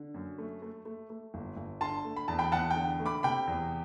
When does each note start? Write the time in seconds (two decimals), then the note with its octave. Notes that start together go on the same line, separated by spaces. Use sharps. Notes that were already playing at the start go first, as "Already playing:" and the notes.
Already playing: D3
0.14 F#2
0.38 A3
0.62 A3
0.85 A3
1.10 A3
1.34 G1
1.57 G1
1.81 D3 A5 C6
2.05 A3
2.16 B5
2.28 E2 A5
2.39 G5 B5
2.52 E2 F#5 A5
2.71 G5
2.76 D3
3.00 A3
3.06 B5 D6
3.23 C3 G5 B5
3.47 E2